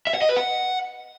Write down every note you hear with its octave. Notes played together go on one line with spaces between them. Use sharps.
E5
F#5
D#5
B4
F#5